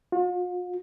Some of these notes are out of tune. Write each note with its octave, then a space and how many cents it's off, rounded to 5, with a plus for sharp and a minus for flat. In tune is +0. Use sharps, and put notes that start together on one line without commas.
F4 +45